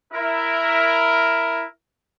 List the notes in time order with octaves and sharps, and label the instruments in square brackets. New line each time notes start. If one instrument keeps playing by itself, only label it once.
[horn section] E4 A#4